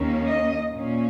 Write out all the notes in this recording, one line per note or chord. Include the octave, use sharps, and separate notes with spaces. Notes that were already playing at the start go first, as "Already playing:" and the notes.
Already playing: D#2 D#3 A#3 C#4
D#5
A#2 A#3 C#4